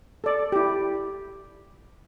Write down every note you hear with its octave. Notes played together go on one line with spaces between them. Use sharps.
A4 D5
E4 G4